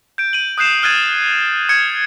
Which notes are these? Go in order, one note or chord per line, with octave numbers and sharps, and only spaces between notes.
G6 D7
D#7 F#7
D#6 F#6 G6 C7 E7
D#6 F6 F#6 G#6 A6 D#7
D#6 F6 G#6 C#7